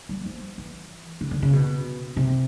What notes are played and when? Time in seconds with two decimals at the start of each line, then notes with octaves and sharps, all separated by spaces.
0.09 G3
0.26 F3
0.58 E3
1.21 D3
1.31 D3
1.42 C#3
1.53 B2
2.16 C3